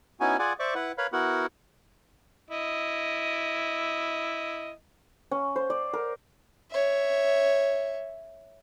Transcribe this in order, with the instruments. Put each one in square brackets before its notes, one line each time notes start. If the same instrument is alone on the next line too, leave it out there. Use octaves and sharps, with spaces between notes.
[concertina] B3 C#4 D#4 E4 F#4 G#5
F4 G#4 D5 F#5 G#5 D6
C5 D5 E5 C#6 D6
E4 B4 F#5
A#4 B4 C#5 F5 B5
B3 E4 F#4 A#4 F#5
[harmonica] E4 D#5
[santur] C#4
C5
D5
A#4
[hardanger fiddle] C#5 E5